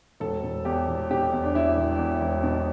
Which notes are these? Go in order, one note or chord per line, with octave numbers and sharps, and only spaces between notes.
E1 A4
E1
E2 G4
E1
B2 G4
E2
D4
E2 E4
E1
E2
E1
B2